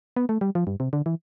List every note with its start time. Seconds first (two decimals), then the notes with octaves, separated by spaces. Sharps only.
0.16 B3
0.29 A3
0.41 G3
0.55 F3
0.67 G2
0.80 C3
0.93 D3
1.06 E3